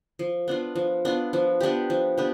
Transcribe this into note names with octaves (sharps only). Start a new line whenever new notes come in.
F3
B3 D4 F4
F3
B3 D4 F4
F3
B3 D4 G4
F3
B3 D4 G4